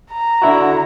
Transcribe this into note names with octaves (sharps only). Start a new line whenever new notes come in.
A#5
D3 E4 F#4